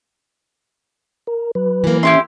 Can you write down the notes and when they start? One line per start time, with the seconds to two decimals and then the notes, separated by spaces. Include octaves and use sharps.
1.27 A#4
1.55 F#3 B4
1.84 E3 A#3
2.03 C#4 E4 G4 E5 C6